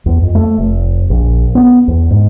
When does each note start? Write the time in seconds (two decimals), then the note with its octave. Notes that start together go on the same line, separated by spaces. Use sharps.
0.06 E2
0.23 F2
0.35 A3
0.58 F1
1.10 A#1
1.55 B3
1.88 E2
2.11 G#2